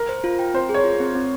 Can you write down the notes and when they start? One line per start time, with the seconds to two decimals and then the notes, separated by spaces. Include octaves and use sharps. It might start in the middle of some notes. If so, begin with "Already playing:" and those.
Already playing: A#4
0.09 C5
0.24 F4
0.39 G5
0.54 C4 C5
0.69 G#4
0.74 C#5
0.84 F4
1.00 C4
1.15 C4